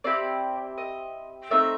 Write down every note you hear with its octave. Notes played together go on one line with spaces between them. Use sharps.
C4 E4 G4 D5
D#5
A3 C4 D#4 E5